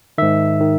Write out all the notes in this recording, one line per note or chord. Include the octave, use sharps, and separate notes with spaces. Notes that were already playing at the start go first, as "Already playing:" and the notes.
G#2 D#3 E5
D#3